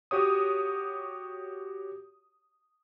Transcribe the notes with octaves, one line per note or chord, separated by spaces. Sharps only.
F#4 G4 C#5 D#6